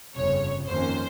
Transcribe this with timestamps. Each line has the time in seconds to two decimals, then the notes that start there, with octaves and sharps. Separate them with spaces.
0.16 G1 F2 C#3 C#5
0.68 F2 D#3 A#3 C#4 C5